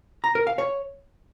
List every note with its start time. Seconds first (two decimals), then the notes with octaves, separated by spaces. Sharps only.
0.24 A#5
0.35 A#4
0.47 F5
0.58 C#5